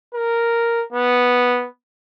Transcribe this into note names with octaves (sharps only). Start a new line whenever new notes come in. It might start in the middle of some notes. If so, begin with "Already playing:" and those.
A#4
B3